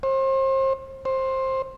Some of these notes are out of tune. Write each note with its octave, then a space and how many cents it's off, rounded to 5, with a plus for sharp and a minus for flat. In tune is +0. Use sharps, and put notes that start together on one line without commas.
C5 +35
C5 +15